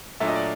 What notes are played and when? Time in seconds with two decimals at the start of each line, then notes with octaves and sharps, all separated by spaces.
0.20 A#2 F#3 A3 D4 E5
0.28 D#5
0.35 D5